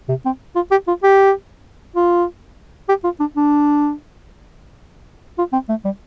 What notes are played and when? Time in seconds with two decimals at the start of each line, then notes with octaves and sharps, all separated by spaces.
0.09 C3
0.26 C4
0.56 F4
0.71 G4
0.88 F4
1.03 G4
1.96 F4
2.89 G4
3.04 F4
3.20 D4
3.36 D4
5.38 F4
5.53 C4
5.69 A3
5.85 G3